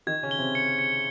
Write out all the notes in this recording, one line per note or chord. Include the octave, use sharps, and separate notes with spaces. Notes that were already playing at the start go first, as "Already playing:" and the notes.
D#3 D#4 G#6
C#3 C#4
G7
C3 C4
C#7
C#7